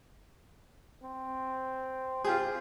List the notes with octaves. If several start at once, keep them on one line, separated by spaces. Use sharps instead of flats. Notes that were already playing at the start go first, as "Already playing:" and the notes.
C4
C4 F4 G4 G#4